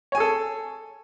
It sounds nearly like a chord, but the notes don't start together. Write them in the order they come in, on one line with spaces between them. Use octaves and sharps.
C#5 G#5 G#4 A4